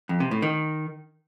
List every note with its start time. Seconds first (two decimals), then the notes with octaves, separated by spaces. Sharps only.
0.09 F2
0.20 C3
0.31 A2
0.42 D#3